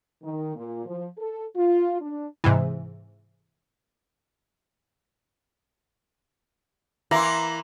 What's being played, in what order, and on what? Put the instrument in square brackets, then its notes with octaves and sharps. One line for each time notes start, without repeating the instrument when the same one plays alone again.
[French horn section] D#3
A#2
F3
A4
F4
D4
[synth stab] G#2 C3 E3
[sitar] E3 A#3 E4 [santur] A#5 C6